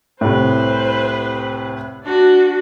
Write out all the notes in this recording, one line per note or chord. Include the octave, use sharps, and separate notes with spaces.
C2 A2 B4 C5
D4 F#4